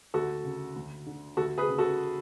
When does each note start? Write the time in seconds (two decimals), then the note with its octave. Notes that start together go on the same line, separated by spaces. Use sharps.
0.14 D2 F#4 A4
0.44 C#3
0.76 D2
1.06 D3
1.37 D2 F#4 A4
1.58 G#4 B4
1.68 C#3
1.78 F#4 A4